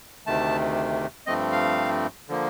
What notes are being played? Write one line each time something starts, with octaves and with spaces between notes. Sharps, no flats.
D2 C3 D#3 A3 A5
G2 F3 A3 C4 D#5
F5
D3 F3 A#3